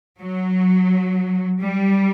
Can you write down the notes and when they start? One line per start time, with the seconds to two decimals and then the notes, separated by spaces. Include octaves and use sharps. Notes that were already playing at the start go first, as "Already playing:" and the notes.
0.20 F#3
1.61 G3